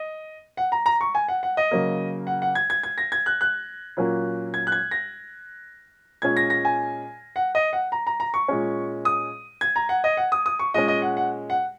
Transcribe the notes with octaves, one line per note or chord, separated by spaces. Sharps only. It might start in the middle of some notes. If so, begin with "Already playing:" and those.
Already playing: D#5
F#5
A#5
A#5
C#6
G#5
F#5
F#5
D#5
C#3 F#3 A#3
F#5
F#5
G#6
G#6
G#6
A#6
G#6
F#6
F#6
A#2 F#3 A#3 C#4
G#6
F#6
G#6
A#6
A#2 G#3 C#4 G#6
A#6
A#6
G#5
F#5
D#5
F#5
A#5
A#5
A#5
C#6
A#2 G#3 C#4
D#6
G#6
A#5
F#5
D#5
F#5
D#6
D#6
C#6
A#2 G#3 C#4 D#5
D#5
F#5
F#5
F#5